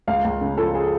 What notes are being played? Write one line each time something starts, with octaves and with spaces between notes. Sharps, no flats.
C#2 F5
C#2
C#3
F3 A4
G#4